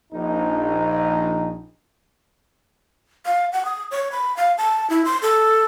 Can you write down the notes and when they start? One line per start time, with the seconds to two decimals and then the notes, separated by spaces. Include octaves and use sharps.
0.13 A#1 D#4
3.25 F5
3.52 F#5
3.65 D#6
3.91 C#5
4.12 B5
4.37 F5
4.58 A5
4.90 E4
5.05 C6
5.22 A4